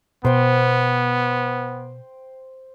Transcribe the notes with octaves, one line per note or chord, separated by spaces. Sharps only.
B2 B3 C5 G5